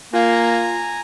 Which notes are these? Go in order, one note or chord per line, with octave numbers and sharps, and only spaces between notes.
A#3 F4 F5 G#5 A#5